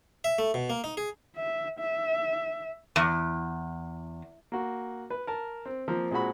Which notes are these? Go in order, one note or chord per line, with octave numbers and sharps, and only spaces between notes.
E5
A3
B2
A#3
D#4
G#4
E5
E5
E2
A#3 F#4
B4
A#4 A5
C4
F3 A#3 C4
A#2 G#3 C4 F#4 B5